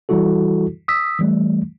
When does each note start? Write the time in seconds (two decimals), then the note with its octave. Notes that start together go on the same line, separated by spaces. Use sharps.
0.09 E3 G3 E4 F#4 A4
0.88 D#6 E6 B6
1.19 E3 G3 A3